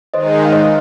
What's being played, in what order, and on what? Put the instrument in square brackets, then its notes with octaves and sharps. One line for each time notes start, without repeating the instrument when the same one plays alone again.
[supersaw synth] D#3 G#3 D#4 [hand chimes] C5 D#5
[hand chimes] F5
C5 D#5